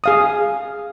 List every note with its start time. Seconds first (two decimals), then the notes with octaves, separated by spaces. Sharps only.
0.04 G#4 F5 D#6